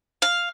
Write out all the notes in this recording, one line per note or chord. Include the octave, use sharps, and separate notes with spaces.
F5